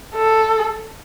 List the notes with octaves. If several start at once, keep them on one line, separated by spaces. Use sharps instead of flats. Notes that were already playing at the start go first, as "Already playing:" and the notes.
A4